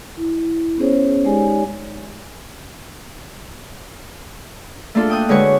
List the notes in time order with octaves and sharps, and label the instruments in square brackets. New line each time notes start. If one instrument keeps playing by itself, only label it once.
[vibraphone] E4
B3 C#4 G#4 C5 C#5
G#3 D#4 G4 C#5 D5 G#5
[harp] A3 A#3 D4 F4 A4
G5 D#6 F#6
D3 G#3 F#4 B4 C#5 C#6